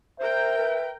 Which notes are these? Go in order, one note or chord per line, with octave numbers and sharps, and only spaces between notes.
A#4 C5 E5 G5
B4